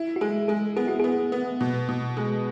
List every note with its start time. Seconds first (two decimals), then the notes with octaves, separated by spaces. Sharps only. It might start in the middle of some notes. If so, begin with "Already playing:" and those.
Already playing: E4
0.16 F#4
0.21 G#3 G#4
0.48 G#3 G#4
0.77 B3 G#4
0.88 F#4
1.00 B3 G#4
1.32 B3
1.61 B2
1.89 B2
2.17 G#3